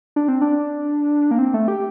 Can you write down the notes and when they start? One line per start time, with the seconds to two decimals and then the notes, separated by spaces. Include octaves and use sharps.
0.16 D4
0.28 C4
0.42 D4
1.31 A#3
1.39 C4
1.54 A3
1.68 G4